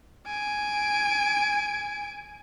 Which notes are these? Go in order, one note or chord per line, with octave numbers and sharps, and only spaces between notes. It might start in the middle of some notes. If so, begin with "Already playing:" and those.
G#5 D7